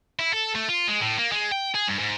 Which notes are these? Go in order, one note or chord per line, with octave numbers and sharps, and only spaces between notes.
E4
A4
A3
F4
G#3
A2
A#3
G#3
G5
G#4
G2
G#2